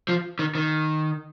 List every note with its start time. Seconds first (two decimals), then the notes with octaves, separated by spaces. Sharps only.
0.09 F3
0.39 D#3
0.55 D#3